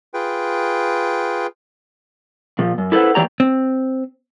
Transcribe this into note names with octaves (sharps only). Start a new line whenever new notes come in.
F4 G#4 B4 G5
A#2 F3
F#2
E4 A4 B4 C5 F#5
E3 A#3 G4 C#5 D5 A#5
C4